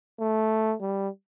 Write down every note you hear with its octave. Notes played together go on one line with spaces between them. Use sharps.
A3
G3